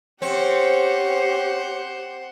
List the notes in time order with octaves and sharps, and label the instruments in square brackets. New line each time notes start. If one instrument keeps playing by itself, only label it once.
[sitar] C4 [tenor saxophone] C#4 [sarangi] G4 [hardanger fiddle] C5 F#5